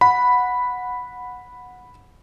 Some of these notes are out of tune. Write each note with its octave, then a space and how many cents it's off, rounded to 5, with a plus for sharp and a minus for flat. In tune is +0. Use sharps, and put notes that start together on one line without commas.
F#5 -15 B5 +0